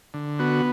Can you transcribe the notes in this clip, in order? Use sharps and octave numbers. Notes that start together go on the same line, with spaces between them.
D3
B3 F#4